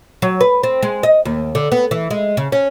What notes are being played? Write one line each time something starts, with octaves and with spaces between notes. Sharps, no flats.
F#3
B4
C4
G#3
D#5
D#2
D3
B3
E3
G#3
C#3
C#4